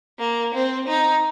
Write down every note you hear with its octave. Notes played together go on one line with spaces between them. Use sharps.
A#3
C4
D#4